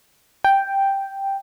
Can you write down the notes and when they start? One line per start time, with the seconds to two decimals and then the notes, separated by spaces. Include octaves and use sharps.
0.44 G5